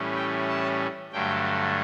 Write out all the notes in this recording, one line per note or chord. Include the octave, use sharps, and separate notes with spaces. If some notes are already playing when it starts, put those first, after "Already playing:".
Already playing: A2 E3 G3 C#4
G5
A5
G2 D3 F#3 A3 G5